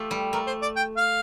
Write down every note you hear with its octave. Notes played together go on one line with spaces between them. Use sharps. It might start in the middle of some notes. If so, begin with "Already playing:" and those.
Already playing: A3 F4 G4
G3
A3 A#4
C5
D5
G5
F5